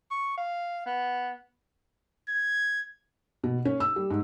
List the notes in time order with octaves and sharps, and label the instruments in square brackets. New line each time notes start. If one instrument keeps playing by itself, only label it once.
[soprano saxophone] C#6
F5
B3
[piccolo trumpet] G#6
[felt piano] B2
C#4
E6
G3
G#2